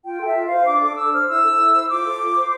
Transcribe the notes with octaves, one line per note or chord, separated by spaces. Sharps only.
F4 G5
A4 E5
F4
F5
C5
D4 D6
A4 D6
D4 E6
C5 F6
E4 E6
A4
E4
C5
F4 D6
A4
F4
C5